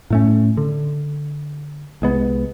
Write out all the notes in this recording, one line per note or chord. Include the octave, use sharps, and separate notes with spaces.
A2 A3 C#4
D3
C2 G#3 B3